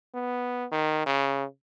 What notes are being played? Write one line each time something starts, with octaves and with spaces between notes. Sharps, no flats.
B3
D#3
C#3